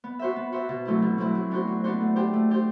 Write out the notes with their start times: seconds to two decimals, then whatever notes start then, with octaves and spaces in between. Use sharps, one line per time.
0.04 B3
0.19 F#4 C5 E5
0.36 B3
0.52 F#4 C5 E5
0.69 B2
0.85 F#3 A3 C4 E4
1.02 B2
1.18 F#3 A3 C4 E4
1.35 F#3
1.51 B3 D4 F#4 C5
1.67 F#3
1.84 B3 D4 F#4 C5
2.01 A3
2.16 D4 G4 C5
2.33 A3
2.50 D4 G4 C5